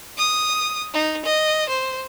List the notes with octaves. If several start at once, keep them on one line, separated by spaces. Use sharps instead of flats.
D#6
D#4
D#5
C5